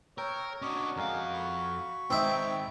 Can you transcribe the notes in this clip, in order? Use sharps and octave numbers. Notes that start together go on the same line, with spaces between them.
A#4 C#5 G5 E6
C#4 D4 F#4 D5 D#5 C#6
F2 G#3 A#4 F5
B5 C#6
G#2 D#3 C4 D#4 E5 G5